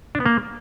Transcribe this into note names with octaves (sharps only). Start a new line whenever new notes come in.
D4
B3
A#3